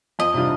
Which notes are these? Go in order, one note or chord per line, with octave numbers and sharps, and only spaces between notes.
F2 D#5
C3 G3 D4 F4